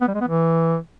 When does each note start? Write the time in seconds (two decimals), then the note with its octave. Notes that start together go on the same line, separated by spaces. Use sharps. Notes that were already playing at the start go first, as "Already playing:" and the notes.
0.01 B3
0.08 G3
0.14 G#3
0.21 B3
0.28 E3